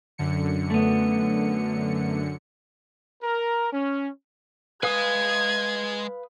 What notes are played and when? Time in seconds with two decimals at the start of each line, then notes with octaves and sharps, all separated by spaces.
0.18 F#2 D3 C#7
0.70 A3 B3
3.23 A#4
3.72 C#4
4.83 G#3 B4 F5 G#5 D#6 G#6